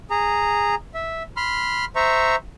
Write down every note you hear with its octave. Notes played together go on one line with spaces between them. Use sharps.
G#4 A#5
E5
B5 C6 F6
C5 E5 A#5 C#6